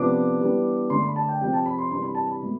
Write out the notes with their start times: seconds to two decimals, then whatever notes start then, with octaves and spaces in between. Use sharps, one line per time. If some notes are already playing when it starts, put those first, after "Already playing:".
Already playing: C3 F3 B3 D4 D6
0.40 E3 G3 B3 D4
0.90 D3 A3 D4 C6
1.03 B5
1.16 A5
1.28 G5
1.41 C3 F3 C4 G5
1.53 A5
1.66 B5
1.78 C6
1.91 C3 E3 G3 D4 C6
2.02 B5
2.15 A5
2.27 B5
2.42 B2 A3